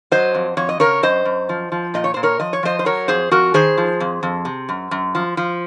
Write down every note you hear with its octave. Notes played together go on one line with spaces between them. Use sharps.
F#3 C5 D#5
F2
F2 C#5
D#5
C#3 A#4 C#5
F#2 C5 D#5
F#2
F3
F3
A#2 D#5
C#5
A#2 C5
A#4 C#5
F3 D#5
C#5
F3 C5 D#5
C5
F#3 A#4 C#5
F2 G#4 C5
F2 F#4 A#4
D#3 G#4 C5
F3
F2
F2
C3
F#2
F#2
F3
F3